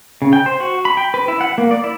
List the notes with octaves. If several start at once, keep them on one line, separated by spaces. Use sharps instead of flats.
C#3
G5
C5
F#4
B5
G5
B4
E4
F#5
A#3
D5
E4